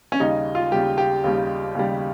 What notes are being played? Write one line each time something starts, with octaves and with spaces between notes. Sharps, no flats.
C#4
D#2 C#3 G3 D#4
F4
D#2 C#3 G3 G4
G4
D#2 C#3 G3
D#2 C#3 G3